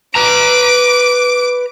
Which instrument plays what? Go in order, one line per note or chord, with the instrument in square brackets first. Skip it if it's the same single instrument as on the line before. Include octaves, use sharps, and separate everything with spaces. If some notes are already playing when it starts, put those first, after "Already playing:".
[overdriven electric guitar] B4 A#5 [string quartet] D6